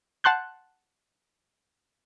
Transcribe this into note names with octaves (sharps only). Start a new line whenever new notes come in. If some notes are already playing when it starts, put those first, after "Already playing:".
F#5 A5 C6 F#6 G6